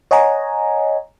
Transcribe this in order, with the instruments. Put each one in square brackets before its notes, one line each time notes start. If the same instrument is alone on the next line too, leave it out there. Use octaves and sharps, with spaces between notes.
[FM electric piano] C#5 D#5 F#5 G#5 A#5